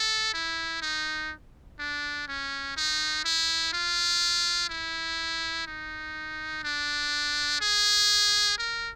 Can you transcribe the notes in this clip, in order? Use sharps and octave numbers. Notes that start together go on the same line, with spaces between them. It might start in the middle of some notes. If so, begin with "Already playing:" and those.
Already playing: A4
E4
D#4
D4
C#4
D#4
E4
F4
E4
D#4
D4
G#4
A#4